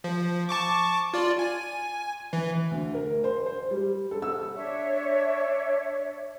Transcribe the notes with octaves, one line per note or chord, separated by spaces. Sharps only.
F3
A5 C#6 D6
F4 D5
G#5
E3
D2
A#4
C5
C5
G3
A4
E6
D4 C#5 E5